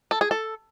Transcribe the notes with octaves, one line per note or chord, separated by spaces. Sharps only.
A4
G#4
A4